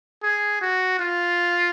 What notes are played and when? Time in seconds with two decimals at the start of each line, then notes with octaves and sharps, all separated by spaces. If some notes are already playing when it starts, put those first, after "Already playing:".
0.23 G#4
0.62 F#4
1.00 F4